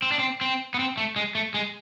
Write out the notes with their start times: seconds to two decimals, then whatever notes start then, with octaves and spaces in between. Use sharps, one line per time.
0.02 C4
0.12 D4
0.19 C4
0.41 C4
0.74 B3
0.79 C4
0.98 A3
1.16 G#3
1.35 A3
1.54 G#3